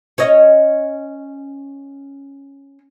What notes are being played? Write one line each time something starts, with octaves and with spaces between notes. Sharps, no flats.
C#4 C#5 D#5